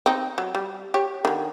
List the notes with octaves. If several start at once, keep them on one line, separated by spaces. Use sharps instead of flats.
C4 D#4
F#3
G3
G4 C#5
D3 D#3